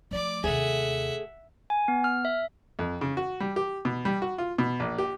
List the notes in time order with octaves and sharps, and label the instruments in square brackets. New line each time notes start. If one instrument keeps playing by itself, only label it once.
[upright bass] F3 A3 [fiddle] D5 D6
[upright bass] D#2 C3 [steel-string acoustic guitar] A3 G#4 [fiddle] E5 F#5
[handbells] G#5
B3
F6
E5
[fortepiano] F2
C#3
F#4
G3
G4
B2
G3
F#4
F4
B2
A#1
G4